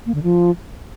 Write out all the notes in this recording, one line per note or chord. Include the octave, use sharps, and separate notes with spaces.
A#3
D3
F3